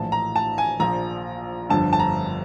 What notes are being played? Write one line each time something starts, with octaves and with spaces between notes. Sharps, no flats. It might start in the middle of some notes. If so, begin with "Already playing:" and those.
Already playing: A#1 A2 E3 A5
A#5
A5
G#5
A#1 A#2 F3 A#5
G1 F2 D3 A5
A5
A#5